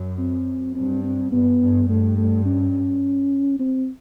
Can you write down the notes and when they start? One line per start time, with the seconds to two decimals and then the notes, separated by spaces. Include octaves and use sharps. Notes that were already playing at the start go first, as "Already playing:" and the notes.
Already playing: F#2
0.19 C4
0.75 G2 C4
1.04 C4
1.32 G2 B3
1.60 G2
1.89 G2 A3
2.18 A3
2.45 C#4
3.59 C4